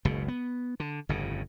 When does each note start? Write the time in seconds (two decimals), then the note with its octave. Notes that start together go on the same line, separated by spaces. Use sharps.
0.05 F#1 C#2 B2
0.28 B3
0.80 D3
1.09 G1 F2 A2 C#3